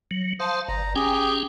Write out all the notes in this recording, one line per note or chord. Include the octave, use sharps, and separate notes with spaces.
F#3
C5 F5 A5 D#6
G1 A#5
C#4 G4 G#4 G5 G#5